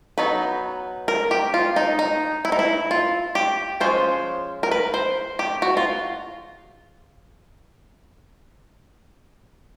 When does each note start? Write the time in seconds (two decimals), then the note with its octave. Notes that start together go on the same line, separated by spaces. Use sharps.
0.18 F#3 B3 D#4 B4
1.08 A#4
1.31 G4
1.54 F4
1.76 D#4
1.99 D#4
2.45 E4
2.52 D#4
2.59 E4
2.91 F4
3.35 G4
3.80 F3 G#3 C#4 C5
4.63 A#4
4.71 B4
4.94 C5
5.39 G4
5.62 F#4
5.77 F4